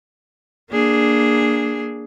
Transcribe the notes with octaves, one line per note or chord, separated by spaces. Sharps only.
A#3 D4 G#4